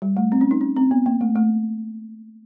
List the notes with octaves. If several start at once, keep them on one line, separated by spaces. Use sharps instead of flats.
G3
A3
C4
C#4
D#4
C#4
C4
B3
A#3
A3
A3